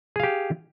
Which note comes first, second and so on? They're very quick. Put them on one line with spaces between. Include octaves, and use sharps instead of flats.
G#4 F5 G4